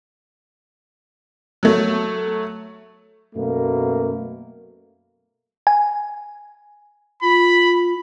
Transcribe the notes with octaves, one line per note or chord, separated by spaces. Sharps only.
F#3 A3
F#2 B2 A3 A#3
G#5
F4 B5